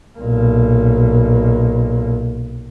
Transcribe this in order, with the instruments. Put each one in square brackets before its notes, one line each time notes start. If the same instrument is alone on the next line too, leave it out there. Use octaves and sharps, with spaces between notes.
[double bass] B1 A#2